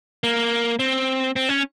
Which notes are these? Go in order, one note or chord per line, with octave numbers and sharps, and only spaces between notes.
A#3
C4
C4
C#4